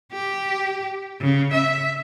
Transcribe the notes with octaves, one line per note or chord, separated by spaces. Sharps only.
G4
C#3
E5